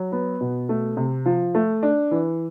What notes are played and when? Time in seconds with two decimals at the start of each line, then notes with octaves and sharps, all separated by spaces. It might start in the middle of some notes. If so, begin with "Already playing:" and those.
Already playing: F#3
0.12 B3
0.41 B2
0.69 A3
0.97 C3
1.26 F3
1.55 A3
1.83 D4
2.11 E3